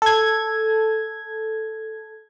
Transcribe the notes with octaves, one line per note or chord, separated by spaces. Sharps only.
A4 G#6